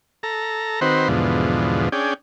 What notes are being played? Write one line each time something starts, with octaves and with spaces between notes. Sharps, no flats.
A4 A#5
D#3 C4 F#4 B4 C5
E2 G#2 B2 D3 F3
C#4 D4 G#4 G5